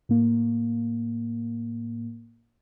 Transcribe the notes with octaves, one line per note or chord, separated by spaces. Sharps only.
A2 A#3